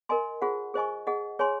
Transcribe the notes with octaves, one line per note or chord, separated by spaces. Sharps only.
A#4 D#5 G#5 C6
F4 G#4 C5 F#5
G#4 C5 D#5 G#5 C#6
G#4 D#5 F#5
G#4 C#5 G#5 C6